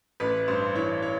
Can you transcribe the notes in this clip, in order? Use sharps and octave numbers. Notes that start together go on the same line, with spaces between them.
A1 B4
G2 C5
E3 C#5
C#5